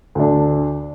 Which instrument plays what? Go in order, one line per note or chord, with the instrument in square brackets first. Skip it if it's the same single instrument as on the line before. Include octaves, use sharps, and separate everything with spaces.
[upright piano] D2 D4